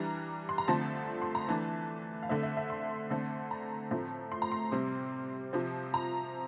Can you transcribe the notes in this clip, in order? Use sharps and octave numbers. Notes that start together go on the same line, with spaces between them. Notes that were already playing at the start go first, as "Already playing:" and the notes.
Already playing: E3 G3 D4 A#5
C6
A#5
D3 F3 A3 C4 A5
C6
A#5
E3 A3 D4 A5
F5
D3 A3 C4 E5
E5
E5
C6
D3 A3 C4
A#5
A2 F3 A3 C4
C6
A#5
C6
C3 G3 C4
C3 F3 C4
A#5